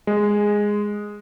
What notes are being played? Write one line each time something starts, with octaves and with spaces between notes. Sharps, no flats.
G#3